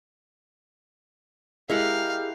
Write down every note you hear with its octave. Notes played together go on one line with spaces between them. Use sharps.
G#3 E4 G4 A#4 F5 F#5